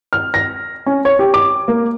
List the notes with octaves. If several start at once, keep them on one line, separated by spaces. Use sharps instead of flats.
F6
A#6
C#4
C#5
G4
D6
A#3